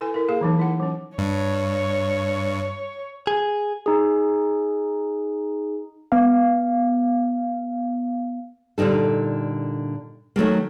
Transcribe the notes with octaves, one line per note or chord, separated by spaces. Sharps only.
E4 A4 B4 G#5
E4 A#4
A#3 G#4 F5
E3 F#3 D#4
E4 F#5
F#3 C#4
G2 C#5
G#4
D#4 G#4
B3 F5
A#2 D3 G3 D#4 A4
D#3 F#3 A3 A#3